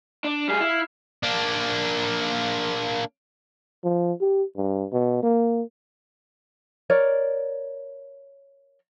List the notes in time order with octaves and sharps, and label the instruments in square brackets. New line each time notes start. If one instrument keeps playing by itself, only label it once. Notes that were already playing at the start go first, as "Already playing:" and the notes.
[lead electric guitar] D4
[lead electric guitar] G3 G#4 [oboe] F5
[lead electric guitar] E4
[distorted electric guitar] A#3 D4
[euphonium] F3
G4
G2
B2
A#3
[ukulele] A#4 C#5 D5